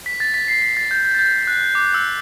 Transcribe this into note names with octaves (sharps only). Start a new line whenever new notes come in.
B6
A6
B6
C7
B6
A6
G6
G6
A6
G6
F#6
D6
E6